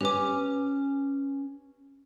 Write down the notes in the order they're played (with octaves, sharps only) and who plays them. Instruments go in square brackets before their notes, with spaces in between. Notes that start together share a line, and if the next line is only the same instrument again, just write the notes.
[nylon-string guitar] C#4 B4 G#5 [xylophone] G4 D6